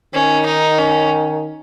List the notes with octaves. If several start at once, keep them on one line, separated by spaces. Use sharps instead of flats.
D#3 C#4
D#4
C#4